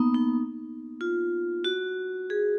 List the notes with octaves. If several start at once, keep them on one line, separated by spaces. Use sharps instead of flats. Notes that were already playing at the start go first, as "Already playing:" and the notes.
Already playing: A#3 B3 D#4
D#4
F4
F#4
G#4